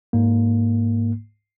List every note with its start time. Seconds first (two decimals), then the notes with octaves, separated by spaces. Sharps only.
0.13 G#2 A#3